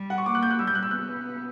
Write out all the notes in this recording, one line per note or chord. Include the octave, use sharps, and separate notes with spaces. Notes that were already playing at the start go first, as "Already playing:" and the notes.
Already playing: G3
F#5
C#6
A#3 D6
F#6
G6
F#6
G3 E6
G6
F#6
E6
B3 F#6